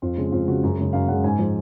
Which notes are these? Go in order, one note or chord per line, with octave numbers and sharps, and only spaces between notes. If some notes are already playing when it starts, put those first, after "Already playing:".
F2 F4
C#3 G#3
F2 F4
C#3 G#3 F#4
F#2 G#4
C#3 G#3
F#2 F5
C#3 G#3 F#5
G#2 G#5
F3 G#3